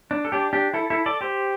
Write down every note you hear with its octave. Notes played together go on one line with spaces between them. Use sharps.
D4
A4
D4 G4
D4 G4
E4 A4
E4 A4
A4 D5
G4 C5